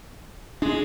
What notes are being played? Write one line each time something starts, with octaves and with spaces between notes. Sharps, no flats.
G#3 D4